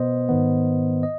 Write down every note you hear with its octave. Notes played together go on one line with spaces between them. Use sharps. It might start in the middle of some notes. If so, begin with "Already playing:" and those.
Already playing: B2 B3 C5 D#5
G#2 D#3 B3
D#5